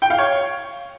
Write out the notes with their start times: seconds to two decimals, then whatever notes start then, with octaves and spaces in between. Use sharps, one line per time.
0.02 G5
0.10 F5
0.18 C#5